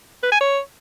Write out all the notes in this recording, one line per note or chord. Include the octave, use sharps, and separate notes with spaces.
B4
G#5
C#5